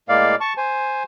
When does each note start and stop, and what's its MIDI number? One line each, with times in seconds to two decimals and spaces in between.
0.09 0.35 45
0.09 0.35 56
0.09 0.35 58
0.09 0.35 74
0.09 0.35 77
0.41 0.53 81
0.41 0.53 85
0.57 1.03 72
0.57 1.03 80